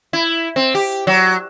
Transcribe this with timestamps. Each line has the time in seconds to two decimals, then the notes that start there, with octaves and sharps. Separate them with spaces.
0.13 E4
0.56 C4
0.75 G4
1.07 F#3